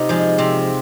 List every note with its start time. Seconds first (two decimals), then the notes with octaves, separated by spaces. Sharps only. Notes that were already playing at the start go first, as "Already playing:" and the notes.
Already playing: C3 C4 D#4 F4
0.09 F3 G#3
0.38 C3 C4